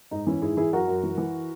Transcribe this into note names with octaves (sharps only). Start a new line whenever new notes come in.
G#2 D#4
E3 C#4 E4
G#2 E4 G#4
E3 E4 G#4
F#2 F#4 A#4
F#2
E3
E3